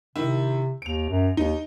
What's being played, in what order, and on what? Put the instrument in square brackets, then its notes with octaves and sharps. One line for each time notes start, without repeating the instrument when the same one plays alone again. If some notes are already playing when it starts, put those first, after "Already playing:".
[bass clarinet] C3 [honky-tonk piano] D#3 E4
[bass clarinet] D#2 [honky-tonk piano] D7 F7
[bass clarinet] F#2
[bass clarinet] D#2 [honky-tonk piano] D#4